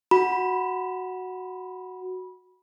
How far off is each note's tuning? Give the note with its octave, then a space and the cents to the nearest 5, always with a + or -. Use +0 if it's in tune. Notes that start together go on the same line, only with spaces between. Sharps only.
F#4 +0 B5 -20